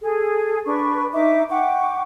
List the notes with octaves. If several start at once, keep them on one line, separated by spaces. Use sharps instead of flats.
G#4 A4
D4 B4 C#6
D#4 E5 D6
F#5 G5 C#6 D6